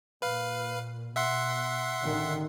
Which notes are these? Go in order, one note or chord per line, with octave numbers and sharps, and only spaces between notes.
A#2 B4 F5
B2 E5 F#5 C6
A1 D3 D#3